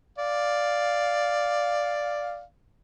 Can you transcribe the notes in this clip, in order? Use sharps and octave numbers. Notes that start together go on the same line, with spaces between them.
D5 F5